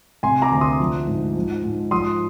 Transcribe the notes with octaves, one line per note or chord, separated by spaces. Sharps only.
C3 G#5 C6
A#5 D6
D2
C6 D#6
F3
G#2
F3
G#2
F3 C6 D#6